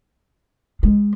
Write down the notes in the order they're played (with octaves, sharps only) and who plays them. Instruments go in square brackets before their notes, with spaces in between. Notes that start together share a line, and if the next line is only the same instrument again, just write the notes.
[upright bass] G#3